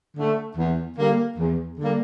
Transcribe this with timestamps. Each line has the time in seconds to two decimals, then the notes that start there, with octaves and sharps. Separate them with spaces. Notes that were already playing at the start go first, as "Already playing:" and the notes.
0.17 D3 A3
0.57 E2
0.97 D3 G3 A#3
1.38 E2
1.79 D3 G3 A#3